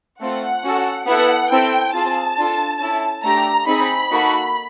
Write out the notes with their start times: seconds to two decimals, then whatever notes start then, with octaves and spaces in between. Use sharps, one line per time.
0.21 A3 C4 F4 A4 F#5
0.63 C#4 F#4 A4
1.07 B3 E4 A4 F#5
1.51 C4 E4 A4 G5
1.93 C4 F4 G#4 A5
2.38 D4 F4 A4
2.81 C#4 E4 A4
3.24 A3 D4 G4 A#5
3.67 C4 D#4 G#4 B5
4.11 A#3 D#4 F#4 A4